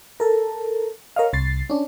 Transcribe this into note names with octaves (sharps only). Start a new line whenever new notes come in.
A4 A#4
A#4 C#5 D#5 F5
C2 A6 C7
C#4 D4